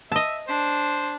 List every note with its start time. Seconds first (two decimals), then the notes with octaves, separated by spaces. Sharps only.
0.12 D#5 E5 A5
0.48 D4 C5